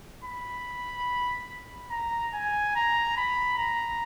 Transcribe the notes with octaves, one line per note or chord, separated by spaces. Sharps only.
B5
A#5
G#5
A#5
B5
A#5